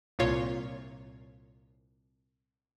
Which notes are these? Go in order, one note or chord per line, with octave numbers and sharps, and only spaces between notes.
C2 A#2 F4 C#5